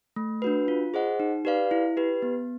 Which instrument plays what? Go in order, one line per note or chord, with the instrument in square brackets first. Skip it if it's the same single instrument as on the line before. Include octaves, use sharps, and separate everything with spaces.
[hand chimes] A3
D4 F#4 B4
F4
G#4 C5 D#5 F#5
D#4
G4 B4 D5 F5
E4
G4 B4
B3